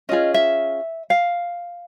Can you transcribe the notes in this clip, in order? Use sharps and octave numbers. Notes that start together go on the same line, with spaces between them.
C#4 F4 G#4 D#5
E5
F5